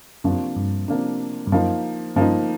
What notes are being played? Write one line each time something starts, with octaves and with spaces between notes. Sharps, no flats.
F#2 C3 F3 A#3 D4
G2
C3 F3 A#3 D4
G2
F#2 F3 A#3 D#4
G2 F3 A#3 D#4